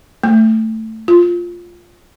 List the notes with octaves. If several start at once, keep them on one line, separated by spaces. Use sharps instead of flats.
A3
F4